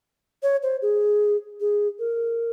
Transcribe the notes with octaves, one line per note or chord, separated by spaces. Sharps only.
C#5
C5
G#4
G#4
A#4